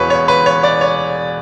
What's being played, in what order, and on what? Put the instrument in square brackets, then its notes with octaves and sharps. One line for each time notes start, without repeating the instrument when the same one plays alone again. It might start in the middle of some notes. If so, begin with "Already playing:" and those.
Already playing: [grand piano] E1 E2 B2 B4 C#5
C#5
B4
C#5
D5
C#5